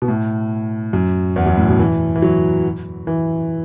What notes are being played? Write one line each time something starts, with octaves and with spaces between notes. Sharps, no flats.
B2
A2
F#2
E2
F#2
A2
B2
E3
E3
F#3
E3